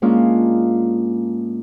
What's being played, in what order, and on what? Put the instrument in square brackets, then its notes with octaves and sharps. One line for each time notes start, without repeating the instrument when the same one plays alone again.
[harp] G#2 G#3 A#3 C#4 D4 F4